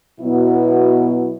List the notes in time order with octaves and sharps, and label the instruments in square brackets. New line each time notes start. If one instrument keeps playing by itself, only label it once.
[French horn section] B2 F#3 B3 E4